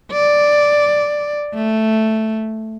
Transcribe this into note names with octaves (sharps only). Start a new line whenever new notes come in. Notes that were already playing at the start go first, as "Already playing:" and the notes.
D5
A3